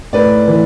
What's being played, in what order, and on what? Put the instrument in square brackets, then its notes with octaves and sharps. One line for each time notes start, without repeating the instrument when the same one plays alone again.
[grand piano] A2 B4 D5
E3